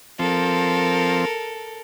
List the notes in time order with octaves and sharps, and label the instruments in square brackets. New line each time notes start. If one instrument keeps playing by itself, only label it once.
[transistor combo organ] F3 C4 [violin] A4 A#4